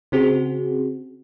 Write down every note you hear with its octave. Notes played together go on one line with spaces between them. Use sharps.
C#3 C4 F#4 G#4